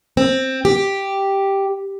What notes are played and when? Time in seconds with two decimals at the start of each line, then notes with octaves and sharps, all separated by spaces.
0.17 C4
0.65 G4